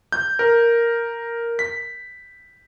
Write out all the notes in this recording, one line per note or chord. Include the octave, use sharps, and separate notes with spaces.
G6
A#4
B6